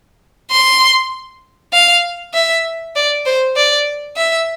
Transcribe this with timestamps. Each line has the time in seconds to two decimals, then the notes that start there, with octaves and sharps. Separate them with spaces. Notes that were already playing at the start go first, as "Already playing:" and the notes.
0.51 C6
1.73 F5
2.34 E5
2.96 D5
3.26 C5
3.56 D5
4.17 E5